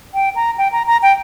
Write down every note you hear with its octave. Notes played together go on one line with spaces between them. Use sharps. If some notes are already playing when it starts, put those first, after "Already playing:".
G5
A#5
G5
A#5
A#5
G5